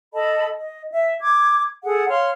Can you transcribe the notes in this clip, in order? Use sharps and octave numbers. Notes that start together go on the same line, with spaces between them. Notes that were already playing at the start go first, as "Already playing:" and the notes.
A4 D#5 A5 B5
D#5
E5
D6 G#6
G#4 A4 F#5
C#5 F5 C6 F6